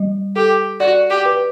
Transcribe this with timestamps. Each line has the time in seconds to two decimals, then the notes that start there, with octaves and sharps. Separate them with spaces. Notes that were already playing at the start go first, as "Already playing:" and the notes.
Already playing: G3
0.36 G4 A4
0.80 F#4 D5
1.10 G4
1.25 B4